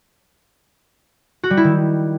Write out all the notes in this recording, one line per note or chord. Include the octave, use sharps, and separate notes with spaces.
F#4
G3
E4
D#3